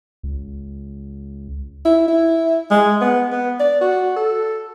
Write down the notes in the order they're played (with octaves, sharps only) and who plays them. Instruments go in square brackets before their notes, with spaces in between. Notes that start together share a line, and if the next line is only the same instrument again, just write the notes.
[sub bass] C#2
[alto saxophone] E4
E4
G#3
B3
B3
D5
F#4
A4